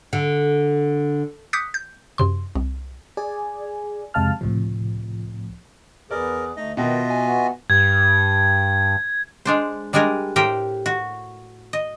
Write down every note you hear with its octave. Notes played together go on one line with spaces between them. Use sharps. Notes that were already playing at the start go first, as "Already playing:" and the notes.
D3
D6 D#6 F#6 G6 B6 C#7
G6
F#2 C3 C6
C2
G#4 D5 G#5
F2 C3 G#3 F5 A5 F6
C#2 A2 C3 F3
E2 G#4 A#4 B4 D5
D2 A3 D#4 D#5
B2 D#3 F4 B4 D#5 E5 G5
F#4 G#5
B3 F#4
G2 G#6
G#3 D4 C5
G3 G#3 D4 G#4 A#4
A2 G4 A#4 C5 G5
F#4
D#5